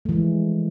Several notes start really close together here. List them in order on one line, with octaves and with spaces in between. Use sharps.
A3 E3 G#3 F3